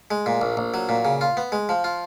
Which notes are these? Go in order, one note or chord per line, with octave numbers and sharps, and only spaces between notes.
G#3
A#2
A#1
A#1
F#3
A#2
C#3
F4
B3
G#3
F3
F4